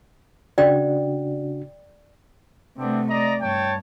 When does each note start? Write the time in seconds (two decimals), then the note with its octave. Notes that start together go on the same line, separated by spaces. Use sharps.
0.58 C#3 D4 F#4 D5 G5
2.78 C3 A3 B3 C4 D4
3.09 D5 D#5 A#5
3.41 G2 C#5 G5 A5